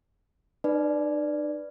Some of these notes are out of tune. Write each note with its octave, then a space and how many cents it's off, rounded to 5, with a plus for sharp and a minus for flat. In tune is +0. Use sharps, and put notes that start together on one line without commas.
D#4 -45 B4 +0 D5 +0